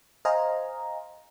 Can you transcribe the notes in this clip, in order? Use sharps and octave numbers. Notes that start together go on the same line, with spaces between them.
C5 D#5 F5 G#5 A#5